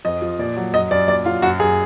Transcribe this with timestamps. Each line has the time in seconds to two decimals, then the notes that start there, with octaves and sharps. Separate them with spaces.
0.05 F2 D#5
0.22 F3
0.39 A#2 D5
0.56 F#3
0.73 F#2 D#5
0.91 F#2 D5
1.08 A#2 D5
1.25 F#3 F4
1.42 F#2 F#4
1.60 F#2 G#4